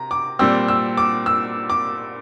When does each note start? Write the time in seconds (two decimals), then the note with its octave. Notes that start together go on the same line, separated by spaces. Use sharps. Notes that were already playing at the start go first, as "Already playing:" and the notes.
Already playing: C3 A#5
0.11 D6
0.39 A#2 G3 C4 E6
0.68 E6
0.97 D6
1.26 E6
1.70 D6